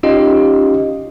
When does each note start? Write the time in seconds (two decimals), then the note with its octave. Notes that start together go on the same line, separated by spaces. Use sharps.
0.03 C#4 D#4 F4 G4 D#5